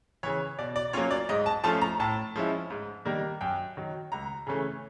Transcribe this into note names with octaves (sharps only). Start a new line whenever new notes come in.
C#3 E3 C#5
B2 D5
D5
F#3 A#3 C#4 F4 C#5
D5
G#2 D#5
A5
F3 A3 C#4 F4 A5
A#5
A2 A5
F3 G#3 C#4 E4
G#2
D#3 G3 A#3 D4
F#2 G5
D#3 F#3
C#2 A#5
C#3 E3 A3 C#4